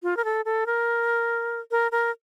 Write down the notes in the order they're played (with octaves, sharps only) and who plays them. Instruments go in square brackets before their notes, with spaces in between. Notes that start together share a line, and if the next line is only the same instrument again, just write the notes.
[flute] F4
A#4
A4
A4
A#4
A#4
A#4